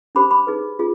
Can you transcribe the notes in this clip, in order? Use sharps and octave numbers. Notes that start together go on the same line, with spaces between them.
D4 G4 C5 B5 D6
B5 D6
D#4 G#4 B4
F4 G#4